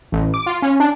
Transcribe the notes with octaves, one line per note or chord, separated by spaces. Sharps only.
A1
D6
F4
C#4
D4